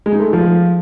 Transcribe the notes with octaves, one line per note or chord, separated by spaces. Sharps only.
G#3
D#4
A3
G#3
F3